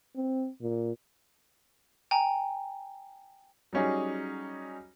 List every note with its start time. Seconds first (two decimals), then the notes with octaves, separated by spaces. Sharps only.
0.15 C4
0.61 A#2
2.11 G5 G#5 A#5
3.73 F#3 G3 C#4 D#4 G#4